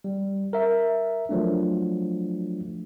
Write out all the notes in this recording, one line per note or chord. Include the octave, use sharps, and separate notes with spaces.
G3
A#4 E5
F3 F#3 A3 D4